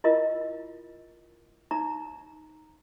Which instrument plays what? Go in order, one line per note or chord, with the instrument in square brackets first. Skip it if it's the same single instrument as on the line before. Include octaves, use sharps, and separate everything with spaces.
[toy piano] E4 F4 A#4 D#5
D#4 A#5